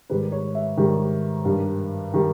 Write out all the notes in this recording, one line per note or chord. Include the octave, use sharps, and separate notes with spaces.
G#2 D#3 G3 B4
C#5
E5
G#2 D#3 G3
G2 D#3 G3
D#3 G3